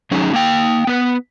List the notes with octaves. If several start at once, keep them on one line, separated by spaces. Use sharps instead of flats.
F#3 C#4 D#4 G#4
A#3 G5
B3 B4